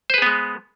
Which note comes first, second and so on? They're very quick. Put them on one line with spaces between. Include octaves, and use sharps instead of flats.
C5 B4 G#4 B3 G#3